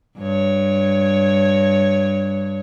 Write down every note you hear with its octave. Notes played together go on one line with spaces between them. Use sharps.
G2 C#5